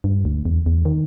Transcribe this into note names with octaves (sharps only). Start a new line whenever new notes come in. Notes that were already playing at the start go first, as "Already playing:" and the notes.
G2
D2
E2
E2
D#3